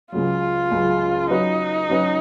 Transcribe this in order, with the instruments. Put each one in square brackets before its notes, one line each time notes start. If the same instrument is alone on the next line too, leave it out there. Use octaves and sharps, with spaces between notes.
[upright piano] C#2 C#3 F#3 [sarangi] F4
[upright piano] C#2 C#3 F#3
[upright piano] F#3 C#4 F#4 B4 [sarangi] D#4
[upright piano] F#3 C#4 F#4 B4